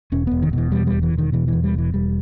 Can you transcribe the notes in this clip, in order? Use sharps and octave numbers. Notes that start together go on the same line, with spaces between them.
E1 C#4
E1 B3
D#3
B2 E3
E2 G3
G3
E1
E3
E1
D#3
B2 E3
E2 E3
G3
E1 E3
E1 G3